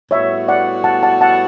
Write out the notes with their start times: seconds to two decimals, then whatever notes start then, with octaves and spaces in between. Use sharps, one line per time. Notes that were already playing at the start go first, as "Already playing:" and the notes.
0.11 A2 G3 B3 F#4 C#5 E5
0.48 D5 F#5
0.84 F#5 A5
1.03 F#5 A5
1.21 F#5 A5